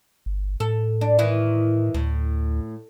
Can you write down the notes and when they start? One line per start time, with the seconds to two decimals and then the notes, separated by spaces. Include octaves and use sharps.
0.26 G1
0.60 A2 A4
1.01 D4
1.19 D#3 E3 E4
1.94 D2 A2